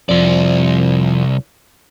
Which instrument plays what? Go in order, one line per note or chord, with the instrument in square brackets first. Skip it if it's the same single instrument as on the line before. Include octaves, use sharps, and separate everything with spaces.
[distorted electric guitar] C2 D5 [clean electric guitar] F2 F3